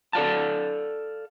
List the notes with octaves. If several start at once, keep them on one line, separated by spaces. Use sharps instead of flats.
A4 D5 F5 A5